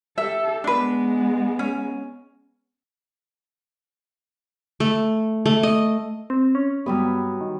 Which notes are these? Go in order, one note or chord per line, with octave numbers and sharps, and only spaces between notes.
G4 A4 E5
G#3 B3 D4 B4
C#4
A3
A3
D#5
C4
C#4
G2 F#3 G3 B3
D#3